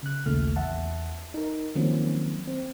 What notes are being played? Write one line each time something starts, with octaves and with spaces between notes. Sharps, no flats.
C#3 F#6
A#1 D#2 A#2 C#3 A3 F6
E2 E5 F#5 A5
D#4 A#4
D#3 F3 F#3 A#3 C4 C#4
C4